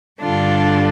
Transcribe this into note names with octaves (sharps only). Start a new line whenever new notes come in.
G2 D3 G3 D4 F4 A4